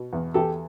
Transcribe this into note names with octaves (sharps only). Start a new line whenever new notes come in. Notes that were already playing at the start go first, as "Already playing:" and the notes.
Already playing: B2
E2
E2 G4 A4